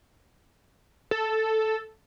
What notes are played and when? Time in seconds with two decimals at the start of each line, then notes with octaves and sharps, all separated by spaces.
1.11 A4